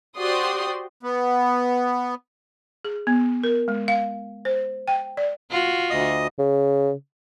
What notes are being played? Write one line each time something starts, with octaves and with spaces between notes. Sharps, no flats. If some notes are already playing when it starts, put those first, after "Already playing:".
F#4 G4 C5 D5 C6 D#6
B3
G#4
B3
A#4
G#3
F5
C5
G5
D5
F4 F#4
D2 D#5 D#6
C#3